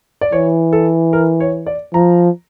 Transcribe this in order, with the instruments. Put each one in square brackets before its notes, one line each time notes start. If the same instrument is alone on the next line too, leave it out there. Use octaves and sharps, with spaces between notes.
[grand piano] D5
[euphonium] E3 [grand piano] C#5
[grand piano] A4
A#4
C#5
D5
[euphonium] F3 [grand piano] A#5